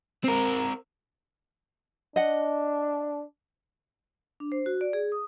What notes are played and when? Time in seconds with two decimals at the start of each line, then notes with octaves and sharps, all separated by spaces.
0.24 C4 A#4
2.16 D4 D#5 F#5
4.40 D4
4.52 C5
4.66 F#4
4.81 D5
4.93 G#4
5.12 D#6